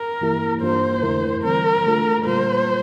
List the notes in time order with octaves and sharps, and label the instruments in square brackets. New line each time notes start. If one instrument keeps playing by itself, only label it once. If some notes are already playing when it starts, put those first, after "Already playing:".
Already playing: [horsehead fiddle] A#4
[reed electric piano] G2 E3 A#3 E4 G4
[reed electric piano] G2 E3 A#3 D4 F4 [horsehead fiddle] C5
[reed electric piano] F2 D3 A3 E4 A#4
[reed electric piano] E3 G3 C4 [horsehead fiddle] A#4
[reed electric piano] D3 A3 D4 F4 A4
[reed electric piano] A#2 G3 A#3 F4 [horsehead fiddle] C5